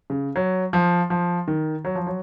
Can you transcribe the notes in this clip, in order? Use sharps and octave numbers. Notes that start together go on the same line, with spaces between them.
C#3
F#3
F3
F3
D#3
F#3
F3
F#3